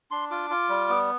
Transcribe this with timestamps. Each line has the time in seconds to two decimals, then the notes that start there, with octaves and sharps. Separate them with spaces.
0.11 D4 C6
0.31 F4 D6
0.50 F4
0.69 G3
0.89 B3